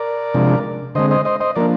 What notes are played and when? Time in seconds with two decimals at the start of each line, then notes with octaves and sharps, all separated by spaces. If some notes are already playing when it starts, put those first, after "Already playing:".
Already playing: A#4 D5
0.34 C3 F3 G#3 D4
0.95 D3 G#3 C4 C5 D#5
1.11 C5 D#5
1.25 C5 D#5
1.40 C5 D#5
1.55 F3 A#3 D4 A#4 D5